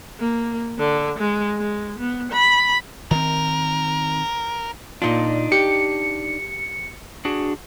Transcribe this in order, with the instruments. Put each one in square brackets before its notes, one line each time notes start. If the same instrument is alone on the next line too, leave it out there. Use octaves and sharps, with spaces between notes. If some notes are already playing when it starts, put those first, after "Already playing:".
[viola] A#3
D3
G#3
G#3
B3
B5
[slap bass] D#3 C4 [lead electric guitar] A#4
[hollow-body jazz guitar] A#2 F4 [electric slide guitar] D4 D#4 D#5
[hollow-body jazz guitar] G4 [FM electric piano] C#7
[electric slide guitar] D4 F#4 G#4